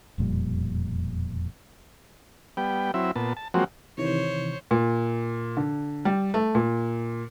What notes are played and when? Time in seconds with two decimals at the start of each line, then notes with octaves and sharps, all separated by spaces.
0.18 E1 F2 A#2 G3
2.57 G3 B3 G5
2.94 F#3 C4 E4 E5
3.16 A#2 B3 A5
3.37 A5
3.54 F3 F#3 G#3 A#3 C4 F#4
3.98 C3 D#3 E3 C5 C#5
4.71 A#2
5.57 D3
6.05 G3
6.34 A3
6.55 A#2